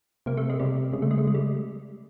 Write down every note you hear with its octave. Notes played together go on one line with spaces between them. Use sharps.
C3 A#3
A3
G#3
C3 G3
C#3 G#3
A3
G#3
A3
G#3
G3